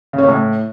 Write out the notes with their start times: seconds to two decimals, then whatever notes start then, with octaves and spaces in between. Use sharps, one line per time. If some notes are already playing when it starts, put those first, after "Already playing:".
0.13 C#3
0.18 C#4
0.23 C#3
0.28 A2